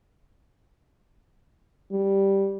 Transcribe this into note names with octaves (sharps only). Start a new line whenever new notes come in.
G3